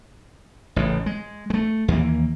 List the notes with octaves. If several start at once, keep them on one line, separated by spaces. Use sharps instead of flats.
A1 A2 C#3
G#3
G#3 A3
D#2 E3 A#3